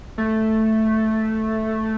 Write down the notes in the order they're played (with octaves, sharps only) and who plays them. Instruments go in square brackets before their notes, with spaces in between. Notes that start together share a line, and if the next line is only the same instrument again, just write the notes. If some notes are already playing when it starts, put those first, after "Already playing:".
[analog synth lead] A3